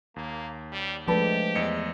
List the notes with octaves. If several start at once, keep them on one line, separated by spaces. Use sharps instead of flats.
D#2 A#3
G3
F3 G#3 A3 D4 G4 A4 B4
E2 D#5 C#7